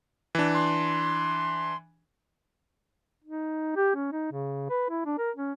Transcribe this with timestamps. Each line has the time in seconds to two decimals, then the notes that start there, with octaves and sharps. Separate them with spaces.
0.35 E3 D4
0.54 C6
3.24 D#4
3.76 G4
3.95 C#4
4.12 D#4
4.31 C#3
4.70 B4
4.90 E4
5.06 D4
5.18 A#4
5.36 C#4